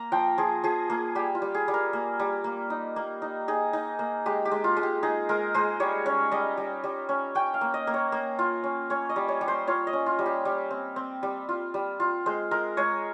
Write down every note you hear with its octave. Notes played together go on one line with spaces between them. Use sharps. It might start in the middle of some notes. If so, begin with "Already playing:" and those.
Already playing: A#3 A#5
F3 G5
F3 G#4
F3 G#4
A#3 G#4
G3 G4
F4
G3
G#4
G3
A#4
A#3
G3
A#3
D#4
A#3
D#4
D#4 G#4
D#4
A#3
G#3 G4
G4
G#3
F4
G#3
G4
D#4 G#4
G#3 A#4
G#3 C5
G3 C#5
C#4 C#5
G3 D#5
G3
G3
C#4
C#4 G5
F5
A#3
D#5
A#3
C#5
A#3
F4
C#4
C#4 C#5
D#5
G3
C#5
G3
C5
F4 C#5
D#5
C#4
F4
G3
G4
G3
C4
C4
G3
F4
G3
F4
G#3 C5
G#3 A#4
G#3 C#5